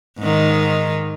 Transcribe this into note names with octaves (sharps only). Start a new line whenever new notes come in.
G#2 D#3